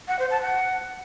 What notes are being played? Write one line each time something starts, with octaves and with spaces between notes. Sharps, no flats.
F#5
C5
A5
F#5